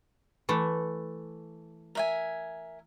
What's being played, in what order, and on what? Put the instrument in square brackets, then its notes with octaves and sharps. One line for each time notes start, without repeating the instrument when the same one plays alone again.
[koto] E3 A3
[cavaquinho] A#4 E5 G#5